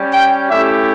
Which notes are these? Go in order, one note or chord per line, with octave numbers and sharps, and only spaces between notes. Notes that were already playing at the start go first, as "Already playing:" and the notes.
Already playing: G3 C#4 G4
G5
A3 C#4 E4 G4 E5